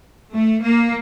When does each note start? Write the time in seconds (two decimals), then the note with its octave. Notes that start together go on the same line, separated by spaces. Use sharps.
0.34 A3
0.62 A#3